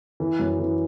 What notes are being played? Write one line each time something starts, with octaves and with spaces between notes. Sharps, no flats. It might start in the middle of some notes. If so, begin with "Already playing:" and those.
E3
F#2
E3